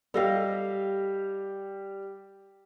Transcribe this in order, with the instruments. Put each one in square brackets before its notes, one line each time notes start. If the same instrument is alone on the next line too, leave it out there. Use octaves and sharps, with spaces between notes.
[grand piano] G3 G4 [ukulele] A4 D#5 F5